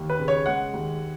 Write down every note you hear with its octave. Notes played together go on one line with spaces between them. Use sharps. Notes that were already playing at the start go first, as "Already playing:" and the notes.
Already playing: D#2
B4
C#3
C#5
G#3 F#5
D#2